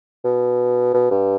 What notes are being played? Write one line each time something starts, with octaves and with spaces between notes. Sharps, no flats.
B2
B2
G2